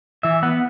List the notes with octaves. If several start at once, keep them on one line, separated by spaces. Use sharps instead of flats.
E3 E5
B3 F#5